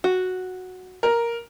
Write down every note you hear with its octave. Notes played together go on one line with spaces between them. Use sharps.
F#4
A#4